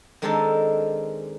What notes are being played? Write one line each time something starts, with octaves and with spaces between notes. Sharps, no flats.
D#3 G#3 C4 D4 A4 A#4